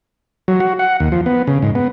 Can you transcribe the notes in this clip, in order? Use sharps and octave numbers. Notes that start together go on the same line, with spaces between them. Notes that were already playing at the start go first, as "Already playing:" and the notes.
F#3
F#4
F#5
D#2
F3
B3
C#3
G#2
B3